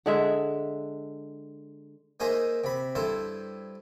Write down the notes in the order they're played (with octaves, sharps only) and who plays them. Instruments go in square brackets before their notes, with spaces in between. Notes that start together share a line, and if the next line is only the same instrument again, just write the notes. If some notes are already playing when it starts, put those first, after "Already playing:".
[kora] D3 G#3 E5
[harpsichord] A#3 D#4 G#4 C5 E5 A#5
C3 B5
G2 E4 A4 C5